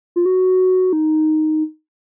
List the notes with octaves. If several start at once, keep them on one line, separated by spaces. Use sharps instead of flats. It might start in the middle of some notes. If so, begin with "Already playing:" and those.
F4
F#4
D#4